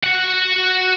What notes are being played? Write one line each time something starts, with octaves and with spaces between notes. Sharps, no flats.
F#4 F#5